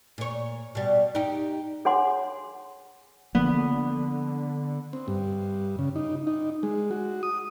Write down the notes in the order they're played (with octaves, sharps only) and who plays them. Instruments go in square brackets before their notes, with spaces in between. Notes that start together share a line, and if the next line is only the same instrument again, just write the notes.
[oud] A#2 C#5
B2 G3
D#4 G4
[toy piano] G#4 C#5 F#5 G#5 C6 D6
[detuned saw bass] D3 [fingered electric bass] F3 A#3 [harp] B3
[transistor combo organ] C4
G2
C#3
D#4
D#4
G#3
F#4
D#6